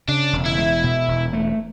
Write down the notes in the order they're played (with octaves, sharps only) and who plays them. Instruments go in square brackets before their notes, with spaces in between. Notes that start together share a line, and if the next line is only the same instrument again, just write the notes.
[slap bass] C#3 [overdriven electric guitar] D4
[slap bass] E1
[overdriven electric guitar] E4
[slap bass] G#3
B2
E1
A3